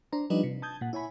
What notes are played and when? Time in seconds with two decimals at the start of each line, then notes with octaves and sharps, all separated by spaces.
0.12 D4 C5 A#5
0.30 F3 G3 D4 D#4 B4 D#5
0.43 C3
0.62 A5 D#6 G6 G#6
0.81 A#2 F#5
0.93 E4 C#5 G#5 B5